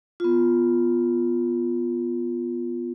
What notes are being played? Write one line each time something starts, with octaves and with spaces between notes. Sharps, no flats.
B3 F4